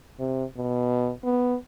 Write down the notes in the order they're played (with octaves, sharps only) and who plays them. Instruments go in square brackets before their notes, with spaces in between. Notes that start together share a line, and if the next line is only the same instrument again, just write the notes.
[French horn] C3
B2
B3